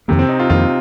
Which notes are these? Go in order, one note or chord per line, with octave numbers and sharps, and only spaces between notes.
F2 C3 D#3 A#3
C4
D#4
F4
F2 D#3 A#3 F4